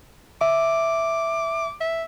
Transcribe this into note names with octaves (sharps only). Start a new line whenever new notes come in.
E5 D6
E5